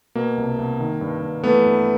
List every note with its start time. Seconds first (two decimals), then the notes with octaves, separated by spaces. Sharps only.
0.15 B2 A#3
0.37 C2
0.58 C2
0.80 D#3
1.01 G2
1.22 G2
1.44 E3 A3 B3
1.65 G2